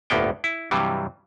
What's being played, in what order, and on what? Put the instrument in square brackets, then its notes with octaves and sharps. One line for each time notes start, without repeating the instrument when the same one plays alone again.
[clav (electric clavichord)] G1 D2 A2 A#3 B3 G5
E4
G2 C3 E3 F#3 G3